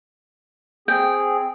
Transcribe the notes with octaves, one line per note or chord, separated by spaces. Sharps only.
C4 G#4 G5